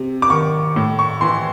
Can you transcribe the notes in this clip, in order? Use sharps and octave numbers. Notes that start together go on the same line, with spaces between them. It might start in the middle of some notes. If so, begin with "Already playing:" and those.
Already playing: C3
D6
D#3 C#6
A2
C#6
E3 C6